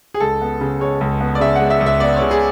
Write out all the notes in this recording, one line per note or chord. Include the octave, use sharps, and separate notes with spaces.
G#4
C#2 A4
B3
C#3
G#3 C#5
C#2
B3
D5
C#3 E5
F#5
G#3
E5
C#2
E5
B3 D5
C#5
C#3
G#4